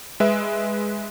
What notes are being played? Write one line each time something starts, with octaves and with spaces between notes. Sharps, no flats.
G#3 B4 E5